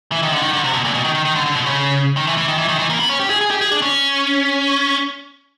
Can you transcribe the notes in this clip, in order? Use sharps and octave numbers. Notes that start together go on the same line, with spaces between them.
E3
D#3
D3
D#3
D3
C3
B2
A#2
B2
D#3
D#3
D#3
D3
D3
B2
C#3
D#3
E3
E3
D#3
E3
D#3
E3
A#3
B3
C#4
G4
G#4
G#4
G4
G#4
D4
C#4